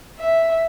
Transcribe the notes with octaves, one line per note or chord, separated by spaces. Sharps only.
E5